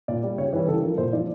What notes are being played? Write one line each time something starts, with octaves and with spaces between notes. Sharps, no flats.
A#2 D5
G3
C#3 C#5
E3 G3 B4
C#3 A4
F3 A#4
A#2 C5
F3 D5